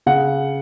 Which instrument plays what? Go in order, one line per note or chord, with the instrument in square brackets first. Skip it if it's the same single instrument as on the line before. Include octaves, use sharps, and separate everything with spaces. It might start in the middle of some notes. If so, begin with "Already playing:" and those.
[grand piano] C#3 F#5